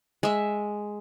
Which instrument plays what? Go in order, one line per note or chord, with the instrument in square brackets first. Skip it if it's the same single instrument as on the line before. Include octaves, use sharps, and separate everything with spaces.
[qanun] G#3 E5